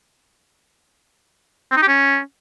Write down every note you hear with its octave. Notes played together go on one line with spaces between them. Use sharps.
C4
D#4
G4
C#4